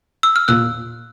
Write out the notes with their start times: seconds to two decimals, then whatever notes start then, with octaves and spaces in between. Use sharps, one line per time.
0.23 E6
0.36 F6
0.48 A#2 E6 F#6